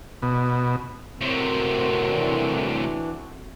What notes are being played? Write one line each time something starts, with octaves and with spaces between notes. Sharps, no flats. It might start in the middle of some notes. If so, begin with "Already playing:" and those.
B2
A2 C3 C4 F#4 A4 A#4
E3 D4